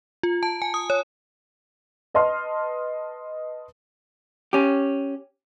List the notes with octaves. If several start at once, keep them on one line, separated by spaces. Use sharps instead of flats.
F4
A5
G#5
D#6
C#5
B4 D#5 A5 C6 F6
C#4 G4